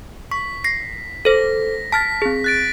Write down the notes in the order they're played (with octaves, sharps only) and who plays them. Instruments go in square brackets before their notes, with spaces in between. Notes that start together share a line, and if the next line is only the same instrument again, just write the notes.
[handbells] C#6 [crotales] B6
[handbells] A#6 C7
[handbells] A4 C5 [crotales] A#6
[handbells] A5 F6 A6 [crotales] B6
[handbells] C4 G#4
[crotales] F#6 A6 D7